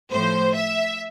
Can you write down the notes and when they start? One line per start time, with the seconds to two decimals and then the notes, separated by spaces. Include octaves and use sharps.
0.12 A2 F3 C5
0.54 E5